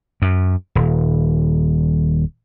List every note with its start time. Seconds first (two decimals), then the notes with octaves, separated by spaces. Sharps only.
0.22 F#2
0.75 D#1